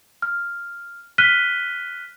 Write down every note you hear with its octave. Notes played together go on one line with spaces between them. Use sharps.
F6
F6 F#6 B6 D#7 G7